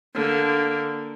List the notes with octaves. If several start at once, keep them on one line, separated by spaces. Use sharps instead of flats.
D3 A#3